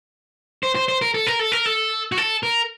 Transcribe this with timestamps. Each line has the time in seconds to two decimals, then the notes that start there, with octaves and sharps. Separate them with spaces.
0.63 C5
0.75 C5
0.88 C5
1.02 A#4
1.14 A4
1.27 A#4
1.39 A4
1.52 A#4
1.66 A4
2.12 F#4
2.18 A4
2.43 A#4